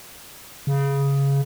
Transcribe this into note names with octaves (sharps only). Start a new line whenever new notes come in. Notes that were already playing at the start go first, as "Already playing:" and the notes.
C#3